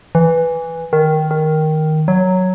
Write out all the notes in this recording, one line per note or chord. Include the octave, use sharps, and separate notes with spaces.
E3
D#3
D#3
F#3